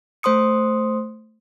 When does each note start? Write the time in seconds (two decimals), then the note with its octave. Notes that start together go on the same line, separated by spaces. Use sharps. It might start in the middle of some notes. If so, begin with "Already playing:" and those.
0.23 A3 C5 C6 D#6 C#7